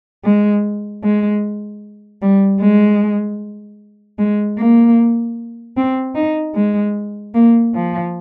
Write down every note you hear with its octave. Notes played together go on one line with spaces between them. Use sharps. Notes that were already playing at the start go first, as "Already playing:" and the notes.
G#3
G#3
G3
G#3
G#3
A#3
C4
D#4
G#3
A#3
F3